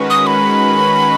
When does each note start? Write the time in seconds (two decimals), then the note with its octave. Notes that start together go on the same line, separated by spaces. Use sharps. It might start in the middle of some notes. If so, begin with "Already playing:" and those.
Already playing: D#3 G#3 C#4 F#4 B4
0.10 D#6
0.27 B5